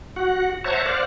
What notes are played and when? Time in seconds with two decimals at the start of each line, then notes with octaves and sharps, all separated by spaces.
0.16 F#4 F#5
0.64 C5 C#5 E5 F#5 A5 A#5
0.86 C5 D5 F5 F#5